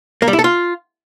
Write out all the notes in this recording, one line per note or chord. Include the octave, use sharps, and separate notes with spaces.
A#3
G3
E4
A4
F4